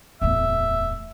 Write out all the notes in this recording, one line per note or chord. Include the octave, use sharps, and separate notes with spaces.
D1 E2 E5